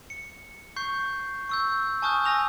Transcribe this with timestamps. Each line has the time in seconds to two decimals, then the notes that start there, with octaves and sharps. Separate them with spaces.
0.10 C#7
0.76 C#6 G6 C7
1.49 C#6 E6 G6
2.02 G#5 A5 C#6 D#6 F6 G6
2.25 G#5 E6 A#6 F7